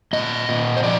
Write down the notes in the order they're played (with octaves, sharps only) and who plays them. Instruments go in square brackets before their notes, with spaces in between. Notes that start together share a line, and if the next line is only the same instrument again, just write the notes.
[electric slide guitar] A#2 D#5
A#2
C5
F3 D5